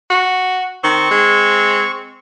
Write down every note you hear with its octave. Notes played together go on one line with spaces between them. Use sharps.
F#4
D#3 C4 C#6
G#3